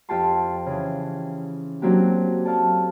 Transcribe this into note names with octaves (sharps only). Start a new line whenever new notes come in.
F2 F4 G4 G5 A5 C6
C#3 E3
F#3 A#3 C4 D4 F#4 G4
A4 D5 F5 A5